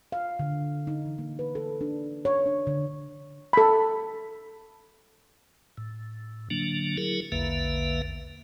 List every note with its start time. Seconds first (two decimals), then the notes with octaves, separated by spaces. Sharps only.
0.12 F5
0.39 D3
0.87 D#4
1.05 E3
1.18 A#3
1.39 B4
1.55 A4
1.81 D4
2.25 C#5
2.46 D4
2.67 D3
3.53 A4 B5
5.78 A2
6.50 D3 F#3 A#3 D4
6.97 F#3 E4 G#4 A#4
7.32 A#1 E2 D3 A#3 B4 E5